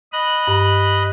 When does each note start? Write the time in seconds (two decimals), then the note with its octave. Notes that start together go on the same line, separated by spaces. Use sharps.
0.13 D#5 B5 F#6
0.48 G2